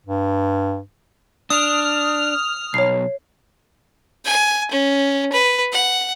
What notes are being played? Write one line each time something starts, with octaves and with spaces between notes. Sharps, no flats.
G2
D4 D#6 F6
B1 C#5 C7
G#5
C#4
B4
F#5